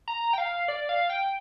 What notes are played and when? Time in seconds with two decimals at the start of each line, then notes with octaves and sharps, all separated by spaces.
0.08 A#5
0.33 G5
0.38 F5
0.68 D5
0.89 F5
1.10 G5